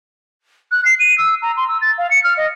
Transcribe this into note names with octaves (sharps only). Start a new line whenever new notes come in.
F#6
C7
D#7
E6
A#5
C6
E6
A6
F5
C#7
F6
D#5